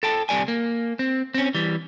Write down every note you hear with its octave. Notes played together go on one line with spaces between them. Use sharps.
A4 G5 A5
C2 C3 G3 D5 G#5
A#3
C4
C4 C#4
E3 G3